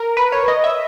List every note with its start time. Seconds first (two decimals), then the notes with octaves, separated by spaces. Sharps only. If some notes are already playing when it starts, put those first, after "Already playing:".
Already playing: A#4
0.17 B4
0.32 C#5
0.48 D#5
0.64 E5